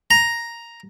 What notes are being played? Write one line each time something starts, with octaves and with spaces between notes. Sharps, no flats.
A#5